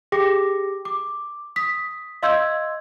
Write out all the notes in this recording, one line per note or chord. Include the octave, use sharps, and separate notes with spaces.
G4 G#4 G5 D6 A#6
D6
D#6 B6
D#5 F5 C6 E6 G6 G#6